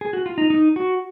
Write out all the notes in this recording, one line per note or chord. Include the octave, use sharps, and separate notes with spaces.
G#4
F#4
F4
D#4
D#4
F#4